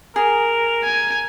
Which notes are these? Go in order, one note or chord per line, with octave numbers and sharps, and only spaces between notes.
G#4 A#4
G#5